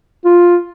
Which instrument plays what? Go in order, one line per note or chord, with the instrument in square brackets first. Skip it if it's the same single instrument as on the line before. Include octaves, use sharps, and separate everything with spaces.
[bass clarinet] F4